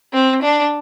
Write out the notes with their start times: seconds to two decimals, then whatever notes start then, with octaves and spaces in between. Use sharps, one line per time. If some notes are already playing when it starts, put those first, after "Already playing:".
0.13 C4
0.42 D4